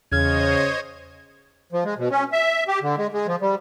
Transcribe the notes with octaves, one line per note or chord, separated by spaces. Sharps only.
E2 C#3 C5 C#5 D#5 F6 G#6
F3
G#3
B2
C#4
E5
G4
D3
G#3
G#3
F3
G3